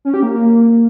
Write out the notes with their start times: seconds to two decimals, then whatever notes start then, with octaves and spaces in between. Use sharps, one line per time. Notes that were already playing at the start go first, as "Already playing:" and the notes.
0.05 C#4
0.14 G4
0.23 A#3